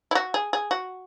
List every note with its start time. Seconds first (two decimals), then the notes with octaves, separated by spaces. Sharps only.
0.11 E4
0.15 F#4
0.34 G#4
0.53 G#4
0.71 F#4